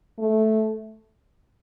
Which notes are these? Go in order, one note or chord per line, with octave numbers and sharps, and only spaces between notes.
A3